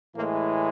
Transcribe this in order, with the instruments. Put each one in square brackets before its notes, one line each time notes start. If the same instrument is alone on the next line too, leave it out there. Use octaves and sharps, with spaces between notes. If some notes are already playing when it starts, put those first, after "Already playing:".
[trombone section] A2 E3 G#3 A#3